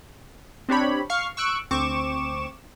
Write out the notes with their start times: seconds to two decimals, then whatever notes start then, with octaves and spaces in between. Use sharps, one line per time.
0.69 C4 D4 G4 C#5 B5
1.10 F5 C#6 F6 C7
1.37 C#6 E6 F#6 D7
1.71 D2 C4 C#6 D6 E7